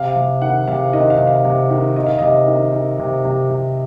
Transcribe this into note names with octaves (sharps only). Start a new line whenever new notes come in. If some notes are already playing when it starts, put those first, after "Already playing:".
Already playing: C3 F5
C3
D#3 F#5
C3 F5
D#3 D#5
F5
C3
F5
C3
D#3
D#3 D#5
F5
C3 D#5
D#3
D#3
C3
C3
C3